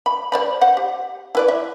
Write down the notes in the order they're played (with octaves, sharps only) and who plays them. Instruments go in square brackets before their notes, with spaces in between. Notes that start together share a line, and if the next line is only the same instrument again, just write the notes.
[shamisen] B5
C5 D5 B5
C5 F#5
G4
E4 B4 D5
E5